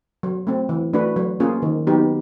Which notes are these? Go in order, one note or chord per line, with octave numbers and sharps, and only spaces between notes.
F#3
A3 C4
E3
A3 D4 F#4 B4
F#3
A#3 C#4 F4 G#4
D#3
F#3 B3 D#4 G4